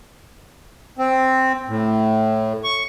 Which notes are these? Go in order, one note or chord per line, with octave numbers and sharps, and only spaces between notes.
C4
A2
C#6